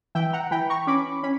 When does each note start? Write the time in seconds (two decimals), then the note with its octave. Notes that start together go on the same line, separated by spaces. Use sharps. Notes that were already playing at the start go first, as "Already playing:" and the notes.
0.15 E3 E5 G5
0.33 F#5 A#5
0.51 E3 G5 B5
0.70 A#5 C#6
0.87 C#4 B5 D6
1.23 C#4 B5